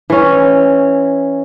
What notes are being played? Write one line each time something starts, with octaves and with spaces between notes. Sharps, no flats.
E3 C#4